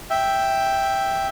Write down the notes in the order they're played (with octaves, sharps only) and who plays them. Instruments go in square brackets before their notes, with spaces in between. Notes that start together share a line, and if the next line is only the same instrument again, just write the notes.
[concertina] E5 G5